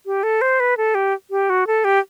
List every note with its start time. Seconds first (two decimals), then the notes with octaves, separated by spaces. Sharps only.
0.06 G4
0.23 A4
0.41 C5
0.60 B4
0.77 A4
0.95 G4
1.31 G4
1.50 F#4
1.67 A4
1.84 G4